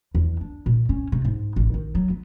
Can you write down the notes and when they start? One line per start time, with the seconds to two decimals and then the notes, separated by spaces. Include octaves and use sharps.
0.15 E2
0.41 D4
0.66 A#2
0.89 C#4
1.12 C3
1.25 G#2
1.56 A1
1.74 D#3
1.95 F#3
2.10 B3